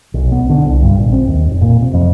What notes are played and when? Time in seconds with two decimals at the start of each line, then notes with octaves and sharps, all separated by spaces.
0.14 B1
0.32 B3
0.49 D3
0.65 C2
0.82 G2
0.98 A#1
1.12 C4
1.27 D#2
1.50 F1
1.61 A#2
1.81 C3
1.94 F2